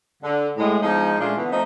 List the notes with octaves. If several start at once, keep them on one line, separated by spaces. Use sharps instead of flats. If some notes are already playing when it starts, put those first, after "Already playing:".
D3
A2 G#3
F3 G#3 B3 D4 D#4
A#2 G#3 A3 C#4 D4 F4
D3 E3 B3
F3 A3 C4 D#4